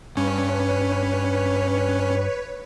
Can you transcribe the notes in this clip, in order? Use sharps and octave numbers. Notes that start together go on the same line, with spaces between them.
G2 C#4 B4 C#5